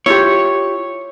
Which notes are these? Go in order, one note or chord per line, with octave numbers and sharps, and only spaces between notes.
E4 F4 G4 C#5